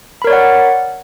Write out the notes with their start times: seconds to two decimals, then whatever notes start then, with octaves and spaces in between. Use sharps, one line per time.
0.22 B5
0.24 A#4
0.27 C#5
0.30 D5
0.33 F#5